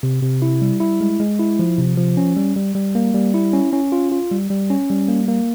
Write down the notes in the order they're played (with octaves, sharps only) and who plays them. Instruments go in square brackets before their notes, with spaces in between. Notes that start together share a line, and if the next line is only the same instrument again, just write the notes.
[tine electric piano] C3
C3
E4
G3
E4
G#3
G#3
E4
F3
C3
F3
C#4
G3
G3
G3
A#3
G3
E4
C#4
C#4
F4
F4
G3
G3
C#4
G3
A#3
A#3